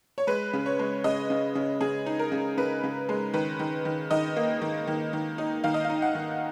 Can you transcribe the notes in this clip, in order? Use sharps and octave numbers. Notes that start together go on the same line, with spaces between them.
C#5
G#3 B4
C#3
C#5
G#3
C#3 D#5
C#3
C#3
C#3 G#4
D#4
A#4
C#3
C#3 B4
C#3
G#3
D#3 B4
D#3
D#3
D#3 D#5
A#3
D#3
D#3
D#3
D#4
D#3 F5
D#5
D#4 F5
F#5
D#3